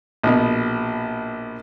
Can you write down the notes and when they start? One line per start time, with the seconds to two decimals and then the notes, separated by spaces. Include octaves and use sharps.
0.23 A#1 B2